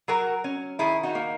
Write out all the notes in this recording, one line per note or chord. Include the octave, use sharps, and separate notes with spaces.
F#3 F#4 A#4
C#4
D#3 E4 G#4
D#4 F#4
A#3